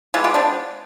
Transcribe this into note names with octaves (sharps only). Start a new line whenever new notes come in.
E3 G#3 B3 F4 G4
F4 G4
C4 D4